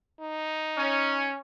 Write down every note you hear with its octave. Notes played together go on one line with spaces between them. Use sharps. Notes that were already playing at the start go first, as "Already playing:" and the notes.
D#4
C#4